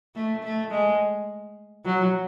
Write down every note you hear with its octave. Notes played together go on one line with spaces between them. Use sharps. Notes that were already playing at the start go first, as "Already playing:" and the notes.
A3
A3
G#3
F#3